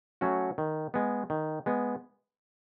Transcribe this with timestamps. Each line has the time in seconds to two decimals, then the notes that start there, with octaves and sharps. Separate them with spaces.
0.21 F#3 A3 C#4 F#4
0.58 D#3
0.94 G#3 B3
1.30 D#3
1.66 G#3 B3